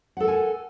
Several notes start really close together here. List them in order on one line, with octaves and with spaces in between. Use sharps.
F#5 A4 A#4 G#5